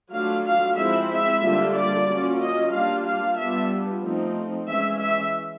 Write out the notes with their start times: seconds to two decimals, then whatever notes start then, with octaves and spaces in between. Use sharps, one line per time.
0.11 F#3 A3 D4 F4 F5
0.44 F5
0.77 F3 G#3 C4 E4 E5
1.10 E5
1.42 D3 G3 A#3 D4 F4
1.74 D5
2.07 F#3 A#3 C#4 F4
2.40 D#5
2.72 G3 A#3 D4 F4 F5
3.05 F5
3.38 G3 B3 D4 F4 E5
4.03 F3 A3 C4 D#4
4.68 E3 G#3 C#4 E5
5.01 E5